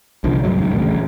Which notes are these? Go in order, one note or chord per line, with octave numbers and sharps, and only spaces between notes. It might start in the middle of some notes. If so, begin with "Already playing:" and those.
C2 D3 F3
D#1 D2 G2 F#3
C#2 F#2 D#3
D#1 A1 D2 C#3